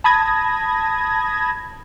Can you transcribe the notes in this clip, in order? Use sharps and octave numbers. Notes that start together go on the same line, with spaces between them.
A5 B5 D#6 G#6 A#6